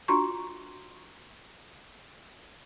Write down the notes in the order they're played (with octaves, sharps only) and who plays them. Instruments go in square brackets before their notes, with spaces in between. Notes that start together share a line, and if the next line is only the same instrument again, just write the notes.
[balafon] D4 F4 F#4 A#5 C6 C#6